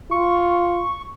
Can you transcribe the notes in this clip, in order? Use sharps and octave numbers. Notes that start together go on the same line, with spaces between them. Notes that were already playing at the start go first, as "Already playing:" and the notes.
F4 C#6